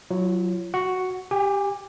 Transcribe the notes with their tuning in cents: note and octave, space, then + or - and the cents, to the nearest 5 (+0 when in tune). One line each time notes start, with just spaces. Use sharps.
F#3 +0 F4 -40
F#4 +0 F#5 +0
G4 +5 G#5 -35